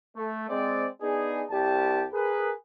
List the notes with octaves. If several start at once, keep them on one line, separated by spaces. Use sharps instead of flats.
A3
G#3 C4 D5
B3 D4 D#4 G#4
C2 G4 A5
G#4 A#4 B4